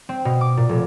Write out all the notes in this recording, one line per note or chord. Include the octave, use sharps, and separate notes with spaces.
C4
B2
D6
A#2
F1